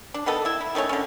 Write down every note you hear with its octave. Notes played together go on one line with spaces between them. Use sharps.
D4
D#3 B3 A4
E4 E5
E4
D#3 A3 C#4 C#5
D3 C#4